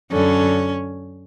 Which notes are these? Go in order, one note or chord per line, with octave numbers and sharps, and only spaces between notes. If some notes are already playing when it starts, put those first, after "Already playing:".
F#2 D3 C#4